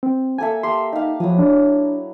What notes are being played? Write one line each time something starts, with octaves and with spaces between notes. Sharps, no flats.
C4
A#3 A4 E5 G#5
G4 A#4 E5 C6
D#4 G4 F5
F3 F#3 E4 D#6
D4